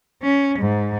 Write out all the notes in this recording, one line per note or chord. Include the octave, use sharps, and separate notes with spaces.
C#4
G#2